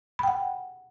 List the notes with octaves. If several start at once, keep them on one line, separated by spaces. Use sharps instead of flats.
F#5 G5 B5